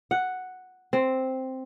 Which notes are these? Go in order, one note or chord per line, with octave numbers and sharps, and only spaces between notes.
F#5
C4